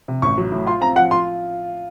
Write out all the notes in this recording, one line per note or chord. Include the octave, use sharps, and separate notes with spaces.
C3
A1 C#6
F#3
A2
F4 C6
C4 A#5
F3 F#5
F4 C6